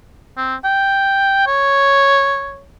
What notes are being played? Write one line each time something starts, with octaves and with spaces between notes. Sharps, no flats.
C4
G5
C#5